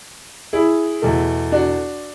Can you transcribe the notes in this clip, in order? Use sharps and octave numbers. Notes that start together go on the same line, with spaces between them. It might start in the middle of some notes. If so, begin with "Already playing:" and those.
E4 G#4
E2 B2 A3
D4 F#4